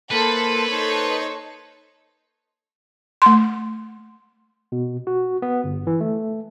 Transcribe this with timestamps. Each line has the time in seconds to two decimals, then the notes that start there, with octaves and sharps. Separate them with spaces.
0.11 A#3 E4 A4 B4 C5
0.69 D#4 C5 C#5 D#5
3.22 A3 C6
4.72 B2
5.07 F#4
5.42 B3
5.64 G1
5.87 E3
6.01 A3